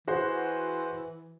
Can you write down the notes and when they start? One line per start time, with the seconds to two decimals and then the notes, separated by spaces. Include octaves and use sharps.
0.08 E3 F#4 G#4 C5